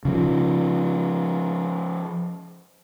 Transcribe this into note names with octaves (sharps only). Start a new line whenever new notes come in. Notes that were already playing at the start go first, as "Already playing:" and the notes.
C#3 F3